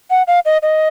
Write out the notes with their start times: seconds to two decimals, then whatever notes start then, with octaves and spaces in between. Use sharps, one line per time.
0.11 F#5
0.27 F5
0.46 D#5
0.63 D#5